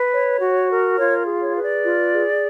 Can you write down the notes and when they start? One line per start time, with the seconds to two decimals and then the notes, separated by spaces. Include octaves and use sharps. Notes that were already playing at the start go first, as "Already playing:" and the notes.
Already playing: B4
0.12 C#5
0.40 F#4
0.70 A#4
0.98 F4 C#5
1.26 G#4
1.42 C#5
1.56 B4
1.62 D5
1.84 F4
2.13 G#4